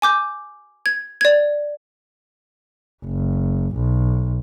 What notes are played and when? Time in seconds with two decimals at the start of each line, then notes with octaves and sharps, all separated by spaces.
0.02 G#5 D6 G6
0.86 G#6
1.21 D5 G#6
3.05 F#1
3.76 B1